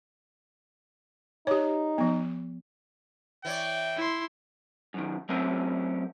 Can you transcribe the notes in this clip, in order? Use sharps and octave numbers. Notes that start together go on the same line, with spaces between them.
D#4 G4 C#5
F3 B3
E3 C#5 D5 G5
E4 C6
F#2 D#3
F#3 A3 C4 C#4 A#4 E5